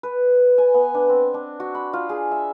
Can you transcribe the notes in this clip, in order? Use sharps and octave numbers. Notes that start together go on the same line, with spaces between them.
B4
G#5
B3
D4
C4
D4
F#4
B5
F4
G#4
E5